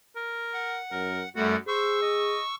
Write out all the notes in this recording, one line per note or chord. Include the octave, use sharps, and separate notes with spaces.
A#4
F#5
F#2 A#4
F#2 G3 A3 F#4 F#5
G#4 C5 C#6 E6
D#5